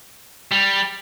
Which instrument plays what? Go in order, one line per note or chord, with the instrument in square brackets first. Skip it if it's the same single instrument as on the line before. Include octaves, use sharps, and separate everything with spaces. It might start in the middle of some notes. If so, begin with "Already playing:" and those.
[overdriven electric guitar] G3